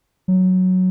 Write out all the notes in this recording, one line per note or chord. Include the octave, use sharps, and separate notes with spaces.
F#3